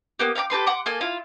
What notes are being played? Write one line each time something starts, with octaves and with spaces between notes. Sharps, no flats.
A#3 B3 G4
F5 G5 B5 D6
G4 A4 B4 C6
F#5 C6 D6
A#3 A4 G#5
E4 F4 F5